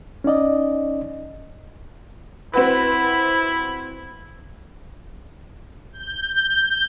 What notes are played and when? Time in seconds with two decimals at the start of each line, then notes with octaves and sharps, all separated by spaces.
0.24 C#4 D#4 D5 D#5
2.54 C4 E4 F#4 B4
5.93 G6